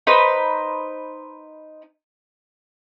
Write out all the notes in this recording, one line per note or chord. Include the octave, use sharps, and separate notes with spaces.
D#4 B4 C5